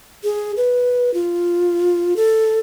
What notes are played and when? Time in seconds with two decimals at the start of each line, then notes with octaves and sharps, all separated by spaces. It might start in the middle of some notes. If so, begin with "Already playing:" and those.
0.24 G#4
0.57 B4
1.14 F4
2.16 A4